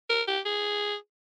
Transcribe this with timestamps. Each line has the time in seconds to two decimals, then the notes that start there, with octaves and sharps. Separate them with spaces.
0.10 A#4
0.28 G4
0.46 G#4